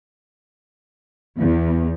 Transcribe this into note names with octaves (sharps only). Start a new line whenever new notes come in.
E2